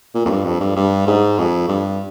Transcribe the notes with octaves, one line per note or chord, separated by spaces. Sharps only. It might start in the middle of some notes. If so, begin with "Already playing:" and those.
A#2
F2
G2
F2
G2
G2
G#2
F2
G2